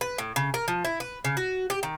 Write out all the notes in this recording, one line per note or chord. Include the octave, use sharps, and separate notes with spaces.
B4
A2
C#3
A#4
F3
E4
B4
C#3
F#4
G4
D#3